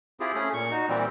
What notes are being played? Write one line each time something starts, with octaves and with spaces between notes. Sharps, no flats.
C4 E4 F4 G4 G#4
A3 C#4 G#4
A#2 C#6
D#4 F#4
A#2 E3 G3 C4